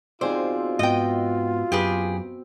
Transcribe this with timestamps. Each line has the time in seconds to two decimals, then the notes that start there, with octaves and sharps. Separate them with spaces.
0.21 B2 C4 D#4 F4 G#4 C5 D5
0.79 G#2 B3 D#5 G5
1.72 F#2 G4 G#4 B4